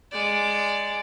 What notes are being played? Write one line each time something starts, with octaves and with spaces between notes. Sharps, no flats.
G#3 D5